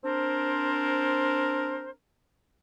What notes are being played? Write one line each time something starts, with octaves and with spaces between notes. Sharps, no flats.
C4 D4 A#4 C5